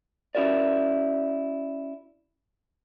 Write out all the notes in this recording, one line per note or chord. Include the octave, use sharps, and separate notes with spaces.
C#4 E4 F#4 A#4 D5